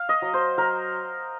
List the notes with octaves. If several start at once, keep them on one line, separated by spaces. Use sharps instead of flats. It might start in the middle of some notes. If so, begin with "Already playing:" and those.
Already playing: F5
D#5
F#3
C5
F#3 A#4